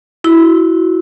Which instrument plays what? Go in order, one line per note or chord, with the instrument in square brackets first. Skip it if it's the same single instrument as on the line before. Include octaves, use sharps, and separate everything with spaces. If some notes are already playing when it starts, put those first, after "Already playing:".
[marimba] E4 [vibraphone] F#4